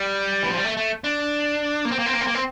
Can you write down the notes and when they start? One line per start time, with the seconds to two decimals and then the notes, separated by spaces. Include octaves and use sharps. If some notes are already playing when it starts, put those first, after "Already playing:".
Already playing: G3
0.43 E3
0.50 F3
0.57 G3
0.64 A3
0.77 A3
1.04 D4
1.85 A#3
1.91 C4
1.99 A#3
2.06 C4
2.13 A#3
2.21 C4
2.27 A#3
2.35 C4